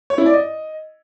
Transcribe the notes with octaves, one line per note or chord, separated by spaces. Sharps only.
C#5
E4
D5
D#5